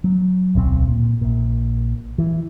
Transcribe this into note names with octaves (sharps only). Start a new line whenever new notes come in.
F#3
D1 B1 C4
A#2
A#1 A#2
E3